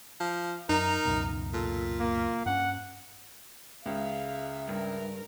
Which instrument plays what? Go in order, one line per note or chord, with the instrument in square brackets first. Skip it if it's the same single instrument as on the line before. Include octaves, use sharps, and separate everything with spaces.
[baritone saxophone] F3
[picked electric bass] F#2 [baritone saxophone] D#4 [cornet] A#4
[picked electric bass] C#2 F#2 B2
[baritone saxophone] A#2 [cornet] A4
[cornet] A#3
[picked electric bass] G2 C#4 [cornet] F#5
[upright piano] C#2 C#3 [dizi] E5 [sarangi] F5
[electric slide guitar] G2 [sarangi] A#4